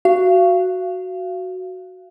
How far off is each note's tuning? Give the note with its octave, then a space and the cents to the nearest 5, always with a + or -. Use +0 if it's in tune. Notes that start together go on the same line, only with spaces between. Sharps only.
F#4 +0 F5 -25